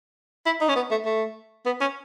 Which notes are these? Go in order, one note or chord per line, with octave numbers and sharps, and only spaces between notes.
E4
D#4
C#4
B3
A3
A3
B3
C#4